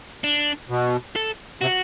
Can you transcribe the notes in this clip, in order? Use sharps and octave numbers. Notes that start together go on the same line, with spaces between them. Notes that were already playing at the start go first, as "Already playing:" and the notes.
D4
B2
A4
C3 F#4